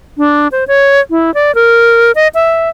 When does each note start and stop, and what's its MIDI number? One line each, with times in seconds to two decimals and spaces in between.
0.18 0.48 62
0.52 0.64 72
0.68 1.00 73
1.10 1.34 64
1.34 1.54 74
1.55 2.12 70
2.15 2.28 75
2.35 2.69 76